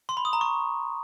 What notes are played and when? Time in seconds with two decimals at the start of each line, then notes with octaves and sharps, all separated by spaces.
0.09 C6
0.17 B5
0.25 D#6
0.33 A#5
0.41 C#6